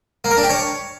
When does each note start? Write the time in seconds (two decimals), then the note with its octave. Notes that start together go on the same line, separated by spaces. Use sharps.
0.24 A#3
0.31 A#4
0.37 D4
0.43 G4
0.49 C#5